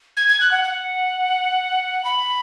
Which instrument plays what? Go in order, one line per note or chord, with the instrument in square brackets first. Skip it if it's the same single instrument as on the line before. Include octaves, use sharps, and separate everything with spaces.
[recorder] G#6
G#6
F#6
F#5
F#5
B5